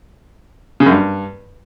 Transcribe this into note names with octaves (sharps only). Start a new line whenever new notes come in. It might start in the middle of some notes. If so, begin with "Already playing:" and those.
C#3
F#2
G2